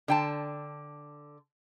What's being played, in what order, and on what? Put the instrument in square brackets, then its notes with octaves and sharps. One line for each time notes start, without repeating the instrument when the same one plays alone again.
[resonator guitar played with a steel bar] D3 G5 A5